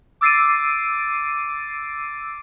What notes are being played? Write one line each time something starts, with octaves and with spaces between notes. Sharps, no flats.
D6 E6 A6 C7 D7 D#7